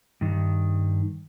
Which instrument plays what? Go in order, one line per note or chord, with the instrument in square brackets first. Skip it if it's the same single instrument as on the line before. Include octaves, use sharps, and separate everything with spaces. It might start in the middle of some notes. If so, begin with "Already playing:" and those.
[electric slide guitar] G2 D#3